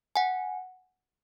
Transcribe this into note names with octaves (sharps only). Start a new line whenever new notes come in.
F#5 G#5